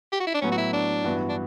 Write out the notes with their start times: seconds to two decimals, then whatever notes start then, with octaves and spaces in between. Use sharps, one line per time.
0.12 G4
0.20 F#4
0.27 E4
0.34 D4
0.42 A2 F#3 B3 C#4
0.52 F#4
0.57 E4
0.73 D4
1.04 G2 E3 B3 F#4
1.29 D4